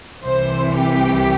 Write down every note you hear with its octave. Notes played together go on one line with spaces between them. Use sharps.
C2 C3 E3 C5
G4